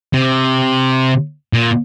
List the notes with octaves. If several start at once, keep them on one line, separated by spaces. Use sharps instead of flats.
C3
A#2